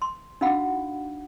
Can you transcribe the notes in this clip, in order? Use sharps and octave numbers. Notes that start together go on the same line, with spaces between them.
C6
D4 D#4 F#4 F5 F#5 B5